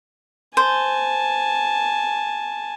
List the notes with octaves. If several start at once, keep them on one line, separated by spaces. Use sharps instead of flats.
C5 G#5 A5